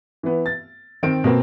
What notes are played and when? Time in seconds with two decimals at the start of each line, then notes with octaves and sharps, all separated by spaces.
0.23 E3 B3
0.46 A6
1.03 D#3 C4 D7
1.24 B2 A#3 C4